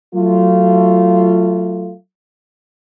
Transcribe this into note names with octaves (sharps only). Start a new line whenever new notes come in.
F#3 A3 F4